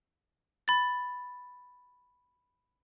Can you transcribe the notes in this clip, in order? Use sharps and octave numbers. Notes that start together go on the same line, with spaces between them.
B5 A6